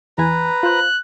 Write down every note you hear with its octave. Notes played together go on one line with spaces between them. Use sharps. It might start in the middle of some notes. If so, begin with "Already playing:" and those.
E2 E3 B4 G#5 A#5
F4 C5 F#6